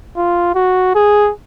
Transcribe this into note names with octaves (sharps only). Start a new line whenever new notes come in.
F4
F#4
G#4